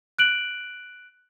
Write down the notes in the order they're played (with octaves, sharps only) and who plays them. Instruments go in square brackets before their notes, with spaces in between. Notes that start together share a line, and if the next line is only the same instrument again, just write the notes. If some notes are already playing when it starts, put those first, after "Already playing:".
[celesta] F#6 D7 F#7